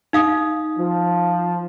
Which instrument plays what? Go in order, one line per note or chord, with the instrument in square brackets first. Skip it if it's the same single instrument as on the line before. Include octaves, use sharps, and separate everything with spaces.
[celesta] D#4 F5 D#6
[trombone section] F3